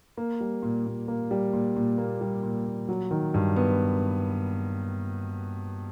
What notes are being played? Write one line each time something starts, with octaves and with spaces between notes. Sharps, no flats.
A#3
G3
A#2
A#2
A#3
G3
A#2
A#2
A#3
G3
A#2
A#2
F#3
D#3
G2
B3